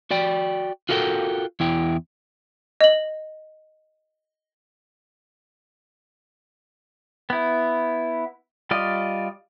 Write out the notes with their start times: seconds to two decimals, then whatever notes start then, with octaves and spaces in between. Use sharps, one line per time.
0.11 F#4 D5 G5
0.89 F4 F#4 A4 A#4 F5 G5
1.60 E2 E4 G5
2.81 D#5 F#7
7.30 B3 E4
8.71 G3 F4 D5 D#5